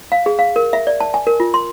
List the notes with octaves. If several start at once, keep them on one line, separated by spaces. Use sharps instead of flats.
F5
G#4
F5
A#4
E5
D5
A5
G#5
A#4
F4
C6